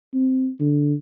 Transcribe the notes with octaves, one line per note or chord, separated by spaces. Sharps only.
C4
D3